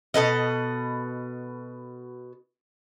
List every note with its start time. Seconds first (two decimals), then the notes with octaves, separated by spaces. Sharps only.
0.14 B2 A4 B4 D#5